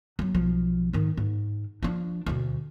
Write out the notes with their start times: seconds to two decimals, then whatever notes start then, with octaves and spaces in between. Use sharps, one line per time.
0.19 F#3 B3
0.35 B1 F3
0.93 G#2 D#3
1.17 G#2
1.83 F3 D4
2.26 D2 B2